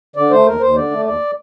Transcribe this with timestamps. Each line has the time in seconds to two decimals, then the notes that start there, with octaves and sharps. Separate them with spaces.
0.16 D3 D5
0.31 A3 C5
0.46 D#2 A#4
0.60 D#2 C5
0.75 D3 D5
0.91 A3
1.06 D#2 D5